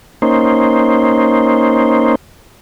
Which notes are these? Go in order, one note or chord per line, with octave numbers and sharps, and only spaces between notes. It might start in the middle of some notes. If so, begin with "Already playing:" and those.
A#3 C#4 D#4 C5